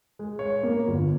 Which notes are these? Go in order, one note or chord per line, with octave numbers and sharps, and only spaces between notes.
G#3
C#5
A#3
G1